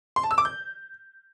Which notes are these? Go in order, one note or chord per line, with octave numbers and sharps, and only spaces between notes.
C6
A5
E6
D6
G6